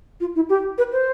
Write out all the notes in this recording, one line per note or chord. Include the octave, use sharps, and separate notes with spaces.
F4
E4
G4
B4
C5